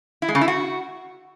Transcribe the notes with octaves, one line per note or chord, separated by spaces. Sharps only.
E4
G#3
C#3
E4
F#4